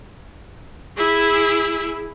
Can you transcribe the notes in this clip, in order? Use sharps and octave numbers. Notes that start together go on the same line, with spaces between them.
E4 G#4